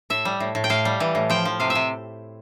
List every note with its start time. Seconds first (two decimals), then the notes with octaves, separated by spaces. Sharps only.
0.10 A2 E5
0.25 G3
0.40 A2
0.55 A2
0.64 G5
0.70 A2 F5
0.85 G3
1.00 E3
1.15 A2
1.30 F3 G5
1.45 F3
1.60 C3 F5
1.70 E5
1.75 C3